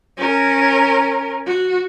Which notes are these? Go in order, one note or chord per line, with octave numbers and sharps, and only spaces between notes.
C#4 A#4
F#4